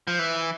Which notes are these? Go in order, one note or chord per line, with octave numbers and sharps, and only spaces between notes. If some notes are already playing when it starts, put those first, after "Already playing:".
F3
E3